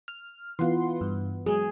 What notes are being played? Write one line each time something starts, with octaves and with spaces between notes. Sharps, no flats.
F6
E3 B3 F4 F#5 C6
G2
F#3 G#3 G#4